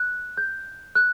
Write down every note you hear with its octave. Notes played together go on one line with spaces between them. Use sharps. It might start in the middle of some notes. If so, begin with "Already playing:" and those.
Already playing: F#6
G6
F#6